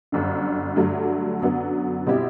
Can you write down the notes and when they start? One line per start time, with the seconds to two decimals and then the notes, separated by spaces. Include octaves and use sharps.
0.12 G1 F#2 D3
0.76 G2 D3 F#3 A3
1.41 F#2 D3 F#3 B3
2.06 B2 G3 C4 E4 G4